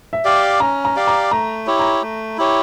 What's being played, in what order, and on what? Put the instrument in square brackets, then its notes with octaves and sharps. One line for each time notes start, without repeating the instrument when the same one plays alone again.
[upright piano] E5
[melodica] G4 D5 F5
[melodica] C#4 [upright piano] A#5
[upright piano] A#5
[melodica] G4 D5 F5
[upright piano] A#5
[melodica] A3 [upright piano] A#5
[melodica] E4 G4 C#5
[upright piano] A#5
[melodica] A3
E4 G4 C#5